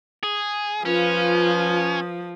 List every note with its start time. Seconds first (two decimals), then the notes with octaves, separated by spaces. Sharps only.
0.23 G#4
0.85 F3 C#4 F4 B4